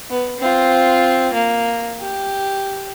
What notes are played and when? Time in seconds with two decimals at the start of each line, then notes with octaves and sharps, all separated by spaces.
0.10 B3
0.40 C4 F4
1.33 A#3
2.00 G4